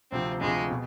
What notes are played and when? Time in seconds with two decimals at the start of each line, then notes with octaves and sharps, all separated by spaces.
0.11 D2 C3 F3 C4
0.41 D2 C3 F3 G#3
0.70 B2